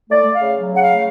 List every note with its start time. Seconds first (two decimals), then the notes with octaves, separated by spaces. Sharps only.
0.10 A3 D5
0.26 A3
0.34 F5
0.41 C#3
0.57 F#3
0.73 C#3 F#5
0.82 F5
0.89 A3